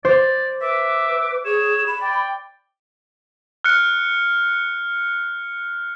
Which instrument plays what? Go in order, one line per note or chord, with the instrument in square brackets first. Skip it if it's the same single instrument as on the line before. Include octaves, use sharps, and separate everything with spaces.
[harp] C5 [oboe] D5
[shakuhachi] B4 [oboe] E5 [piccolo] D6
[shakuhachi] G#4 [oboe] C#5 [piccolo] E7
[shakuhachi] B5
[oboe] D5 [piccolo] G5
[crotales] F6 F#6 C#7